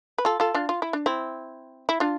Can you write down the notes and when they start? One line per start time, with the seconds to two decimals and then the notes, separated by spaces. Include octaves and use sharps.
0.18 B4
0.25 F4 A4
0.40 F4 A4
0.54 D4 F4
0.69 F4
0.82 E4
0.93 D4
1.06 C4 E4
1.89 E4
2.00 D4 F4